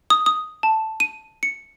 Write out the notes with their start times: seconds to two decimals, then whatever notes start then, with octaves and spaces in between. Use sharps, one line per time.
0.10 D#6
0.26 D#6
0.63 A5
1.00 D#7
1.43 C#7